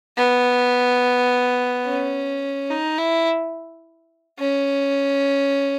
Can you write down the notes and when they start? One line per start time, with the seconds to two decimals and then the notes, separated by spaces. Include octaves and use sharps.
0.17 B3
1.86 C#4
2.70 D#4
2.98 E4
4.39 C#4